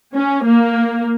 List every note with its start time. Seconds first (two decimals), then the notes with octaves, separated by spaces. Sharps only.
0.15 C#4
0.44 A#3